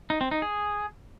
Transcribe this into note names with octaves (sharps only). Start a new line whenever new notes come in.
D#4
C4
D#4
G#4